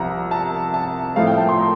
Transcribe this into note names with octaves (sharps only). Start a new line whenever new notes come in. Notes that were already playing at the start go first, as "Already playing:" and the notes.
Already playing: C2 C3 F3 A#5
A5
A5
A2 F3 A3 F5
G5
A5
C6
A#5